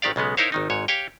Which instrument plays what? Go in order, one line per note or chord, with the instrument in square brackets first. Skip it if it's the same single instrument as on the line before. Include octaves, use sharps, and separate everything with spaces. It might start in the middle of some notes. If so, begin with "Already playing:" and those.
[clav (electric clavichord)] G#1 D#3 G4 D5 F5
B1 C#3 G#3 B3
D#4 E4 A#4 C5 C#5 F5
G#1 D#3 D#4
G#1 G#2 C#5
G4 C#5 F5 G5